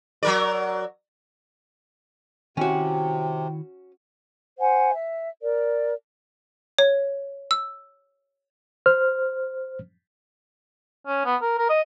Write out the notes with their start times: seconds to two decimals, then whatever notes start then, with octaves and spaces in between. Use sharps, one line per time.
0.23 F#3 A#4 D5
2.57 C3 D#3 C#4 E4 F#4 C#5 G5
4.59 C5 F#5 G#5
4.92 E5
5.41 A#4 D5
6.78 C#5
7.51 E6
8.86 C5 F6
11.07 C#4
11.25 B3
11.42 A#4
11.58 A#4
11.69 D#5